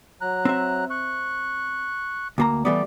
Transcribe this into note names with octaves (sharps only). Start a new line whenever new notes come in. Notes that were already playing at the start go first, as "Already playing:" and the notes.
F#3 A#5 F#6
C4 E5
C#6 F#6
D2 A#3 A#5
E3 G3 A3 B3 D5 D6